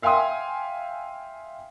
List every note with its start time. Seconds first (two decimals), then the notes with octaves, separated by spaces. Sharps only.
0.02 E5 F5 G5 G#5 C6 D#6